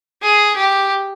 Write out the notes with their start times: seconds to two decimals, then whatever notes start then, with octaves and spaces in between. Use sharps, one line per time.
0.22 G#4
0.56 G4